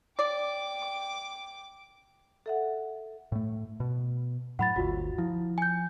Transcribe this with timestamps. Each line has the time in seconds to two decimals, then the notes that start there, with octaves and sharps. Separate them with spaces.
0.19 D5 G5 D6
2.46 A4 E5 F#5
3.32 A2 A3
3.80 B2
4.59 A2 F#3 F#5 B5 A6
4.76 G1 D2 F4 F#4
5.18 F3 E4
5.58 G#5 G6